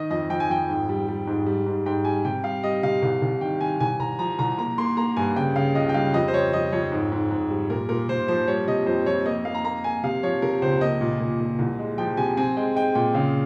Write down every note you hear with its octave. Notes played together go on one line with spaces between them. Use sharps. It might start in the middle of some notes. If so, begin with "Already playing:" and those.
Already playing: D#3 D#5
F2 D#5
F2 G5
G#5
F2 G5
G#2
G3
G3
G#2
G3
G#2
G#2 G5
G3 G#5
C3 G5
G3 F5
G3 D#5
C3 F5
C2
C2
D#3 G5
D#3 G#5
C2 G#5
C2 A#5
F3 A#5
C2 A#5
A#3 A#5
A#3 C6
A#3 A#5
G2 G#5
C#3 G5
C#3 F5
C#2 D#5
G5
G3 F5
F2 D#5
C5
F2 C#5
F2 D#5
F2 C#5
G#2
G#2
G#2
G3
A#2 A#4
A#2 A#4
A#2 C5
F3 C5
G3 C#5
C3 D#5
F2 C5
F2 C#5
A#3 D#5
A#3 F5
A#5
A#3 A#5
A#3 G#5
C3 F5
F3 C#5
C3 A#4
C#2 C5
A#3 D#5
A#2
A#2
A#2
C2
G#3
F3 G5
C3 G#5
C4 G#5
G#3 G5
G#3 G5
A#2 G5
C#3 F5